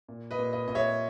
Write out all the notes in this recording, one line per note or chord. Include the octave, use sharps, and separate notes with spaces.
A#2
B4 D#5
A#2
B4 D#5
A#2 D#5
C#5 E5